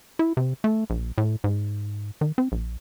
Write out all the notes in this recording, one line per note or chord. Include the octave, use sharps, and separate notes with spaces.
E4
C3
A3
A#1
A2
G#2
D#3
C4
A#1